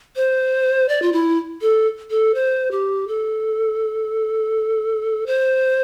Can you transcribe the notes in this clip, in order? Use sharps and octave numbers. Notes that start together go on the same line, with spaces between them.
C5
D5
F4
E4
A4
A4
C5
G4
A4
C5